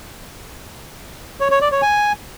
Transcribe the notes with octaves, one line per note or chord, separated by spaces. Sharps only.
C#5
C#5
D5
C#5
G#5